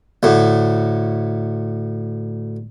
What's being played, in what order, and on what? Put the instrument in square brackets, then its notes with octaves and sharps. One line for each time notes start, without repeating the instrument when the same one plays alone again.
[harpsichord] D2 A2